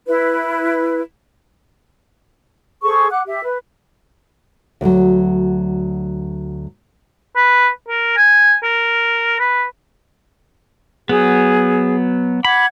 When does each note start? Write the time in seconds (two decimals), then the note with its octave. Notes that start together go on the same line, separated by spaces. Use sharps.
0.07 E4 B4
2.82 G#4 A4 C5 C#6
3.09 F#5 D6 F#6
3.27 G4 E5
3.43 B4
4.81 D2 F#3
7.36 B4
7.88 A#4
8.17 G#5
8.63 A#4
9.39 B4
11.09 F#3 B3 G#4
12.45 F#5 B5 D6 G#6